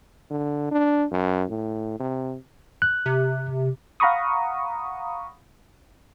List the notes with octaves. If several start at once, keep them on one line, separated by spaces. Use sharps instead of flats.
D3
D4
F#2
A2
C3
F#6
C3
F5 F#5 A#5 B5 C#6 D#6